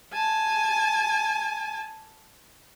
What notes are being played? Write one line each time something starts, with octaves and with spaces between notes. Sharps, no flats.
G#5 A5